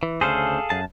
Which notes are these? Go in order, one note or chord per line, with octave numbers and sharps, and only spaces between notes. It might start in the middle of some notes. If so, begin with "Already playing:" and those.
E3
D2 C#3 G#4 A4 C5 F5
F#2 A5